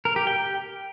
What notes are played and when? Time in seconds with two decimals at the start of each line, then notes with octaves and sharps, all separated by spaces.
0.05 A#4
0.16 G4
0.27 G5